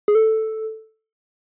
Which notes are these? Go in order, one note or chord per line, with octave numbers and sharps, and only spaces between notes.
G#4
A4